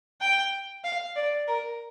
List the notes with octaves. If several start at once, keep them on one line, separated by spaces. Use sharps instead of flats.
G5
F5
D5
A#4